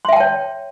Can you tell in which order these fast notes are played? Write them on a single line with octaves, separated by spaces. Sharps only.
C6 E5 G5 A5 C#5